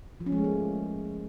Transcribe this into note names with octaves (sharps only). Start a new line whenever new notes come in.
F3
C#4
G#3
A3
A#3